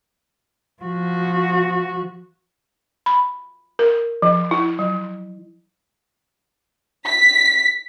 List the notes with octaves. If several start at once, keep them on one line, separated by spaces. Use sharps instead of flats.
F3 F#4
B5
A#4
F3
E4
F#3
B6